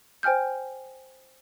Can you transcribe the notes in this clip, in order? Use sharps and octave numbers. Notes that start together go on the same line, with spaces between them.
C5 G5 G#5 F6 G6